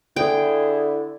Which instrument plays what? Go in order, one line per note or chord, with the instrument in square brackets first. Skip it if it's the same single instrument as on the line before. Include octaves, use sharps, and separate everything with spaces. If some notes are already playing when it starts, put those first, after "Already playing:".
[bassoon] D3 [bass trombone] E4 [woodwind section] G#4 [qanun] G5